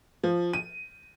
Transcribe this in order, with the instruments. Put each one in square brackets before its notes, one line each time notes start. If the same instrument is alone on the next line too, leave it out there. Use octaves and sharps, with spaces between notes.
[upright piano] F3
D#7